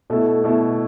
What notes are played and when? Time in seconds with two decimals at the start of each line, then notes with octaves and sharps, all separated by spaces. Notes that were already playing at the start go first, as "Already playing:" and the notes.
0.10 B2 A3 E4 A4
0.44 B2 A3 E4 A4